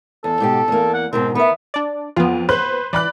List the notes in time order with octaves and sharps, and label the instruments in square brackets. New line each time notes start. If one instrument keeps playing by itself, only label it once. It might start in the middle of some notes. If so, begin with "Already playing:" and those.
[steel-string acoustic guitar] E2 [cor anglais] A4
[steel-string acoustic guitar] G#2 B2 G4
E2 A#3
[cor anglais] F#5
[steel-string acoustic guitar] G#2 B2 D#3 [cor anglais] C4
[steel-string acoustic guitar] D#3 E5 [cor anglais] B3
[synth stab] D4 D5
[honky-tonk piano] F2 [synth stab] B3 F4
[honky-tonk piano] B4 C5 F#6
[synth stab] E3 [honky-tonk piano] D5 B5 F#6